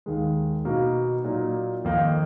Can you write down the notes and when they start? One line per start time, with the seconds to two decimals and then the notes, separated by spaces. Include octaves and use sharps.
0.06 D#2 D#3 G#3
0.65 B2 A#3 D#4 F#4
1.24 A#2 F#3 A#3 D#4
1.85 F2 D#3 A#3 D#4